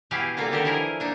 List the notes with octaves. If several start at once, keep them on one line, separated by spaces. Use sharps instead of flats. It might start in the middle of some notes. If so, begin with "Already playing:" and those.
B2 E3 E4 G4 G#4 F5
G3 A3 A#3 F4 F#4
D3 D#3 G4 A4 A#4
E3 F3 E4 G#4 A#4
A#3 D4 D#4